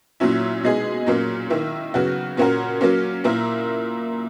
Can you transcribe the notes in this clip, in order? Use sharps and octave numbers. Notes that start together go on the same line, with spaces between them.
A#2 F#3 C#4 E4
B2 G#3 D#4 G#4
A#2 F#3 A#3 C#4
D#3 A#3 E4
C#3 F#3 B3 F#4
A#2 A#3 C#4 F#4 A#4
F#3 A#3 C#4
A#2 A#3 E4 A#4